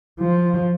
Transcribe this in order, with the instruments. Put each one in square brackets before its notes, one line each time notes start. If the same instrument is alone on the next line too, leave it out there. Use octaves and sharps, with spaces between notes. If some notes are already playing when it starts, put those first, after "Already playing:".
[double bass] F3